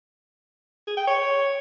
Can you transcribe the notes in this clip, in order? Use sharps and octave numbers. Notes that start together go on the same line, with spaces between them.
G#4
G5
C#5